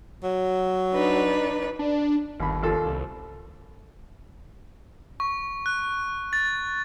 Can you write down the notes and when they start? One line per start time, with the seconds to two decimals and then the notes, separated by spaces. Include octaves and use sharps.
0.23 F#3
0.93 D4 D#4 B4
1.79 D4
2.40 G1 D#2 B5
2.62 D#2 F4 A4
2.86 C2
5.20 C#6
5.66 F#6
6.33 A6